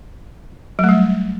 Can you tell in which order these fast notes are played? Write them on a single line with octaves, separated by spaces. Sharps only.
F#3 A3 G3